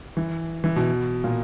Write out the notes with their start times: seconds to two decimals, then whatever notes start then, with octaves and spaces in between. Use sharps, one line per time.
0.17 E3
0.64 E3
0.76 B2
1.24 A#2